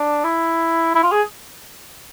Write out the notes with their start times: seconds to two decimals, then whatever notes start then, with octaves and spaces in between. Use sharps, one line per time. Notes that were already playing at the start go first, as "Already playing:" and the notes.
Already playing: D4
0.24 E4
0.95 E4
1.03 F4
1.12 G#4